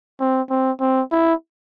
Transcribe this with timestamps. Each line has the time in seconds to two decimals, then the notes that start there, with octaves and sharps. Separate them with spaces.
0.20 C4
0.50 C4
0.81 C4
1.12 E4